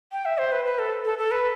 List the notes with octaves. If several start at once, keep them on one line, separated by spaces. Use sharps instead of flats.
G5
E5
C5
B4
B4
A4
A4
A4
B4